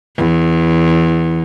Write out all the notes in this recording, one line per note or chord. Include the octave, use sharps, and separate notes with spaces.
E2